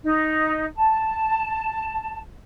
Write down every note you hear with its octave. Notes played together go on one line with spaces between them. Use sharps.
D#4
A5